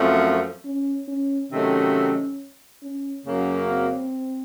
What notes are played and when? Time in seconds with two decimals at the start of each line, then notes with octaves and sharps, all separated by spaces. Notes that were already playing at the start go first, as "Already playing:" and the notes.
Already playing: F#2 F3 A3 C4
0.65 C#4
1.08 C#4
1.51 C3 D#3 F#3 A3 C#4
2.82 C#4
3.26 F#2 C#3 F#3 A#3 C#4
3.70 C4